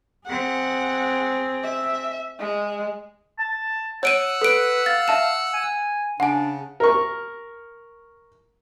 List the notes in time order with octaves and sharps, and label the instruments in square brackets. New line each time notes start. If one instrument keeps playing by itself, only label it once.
[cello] C4 G#4 [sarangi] F#5
[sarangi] E5
G#3
[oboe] A5
[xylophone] C#5 D7 D#7 [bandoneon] F#5 E6 F#6
[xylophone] A4 D7 [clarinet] B4
[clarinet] F5 [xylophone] A6
[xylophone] E5 A5 E7
[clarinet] G#5
[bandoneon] C#3 [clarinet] D4 [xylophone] F#5 G#5
[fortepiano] A#4 C#6